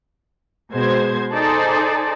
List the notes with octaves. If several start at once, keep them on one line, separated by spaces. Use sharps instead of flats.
B2 G#3 C5 G#6
D#4 G#4 A4 C5 D5